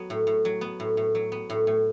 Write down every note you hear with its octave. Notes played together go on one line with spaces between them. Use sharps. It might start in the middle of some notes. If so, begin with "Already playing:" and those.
Already playing: F#3 B3
A2
A2
F#3
B3
A2
A2
F#3
B3
A2
A2